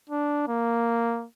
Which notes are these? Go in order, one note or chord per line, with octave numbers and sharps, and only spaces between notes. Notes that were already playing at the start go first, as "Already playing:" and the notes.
D4
A#3